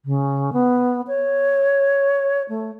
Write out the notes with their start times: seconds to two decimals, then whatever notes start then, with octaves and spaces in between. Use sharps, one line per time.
0.05 C#3
0.52 B3
1.07 C#5
2.49 A3